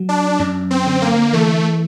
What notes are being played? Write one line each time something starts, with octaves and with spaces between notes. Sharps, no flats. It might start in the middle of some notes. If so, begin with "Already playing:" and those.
Already playing: F#3
D4
F#2
C4
D3
A#3
E3 A3